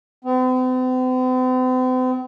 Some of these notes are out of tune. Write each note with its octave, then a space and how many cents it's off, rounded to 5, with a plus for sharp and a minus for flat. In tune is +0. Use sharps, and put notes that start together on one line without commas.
C4 -45